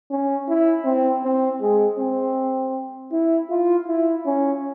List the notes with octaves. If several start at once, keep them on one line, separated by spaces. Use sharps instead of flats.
C#4
E4
C4
C4
G#3
C4
E4
F4
E4
C#4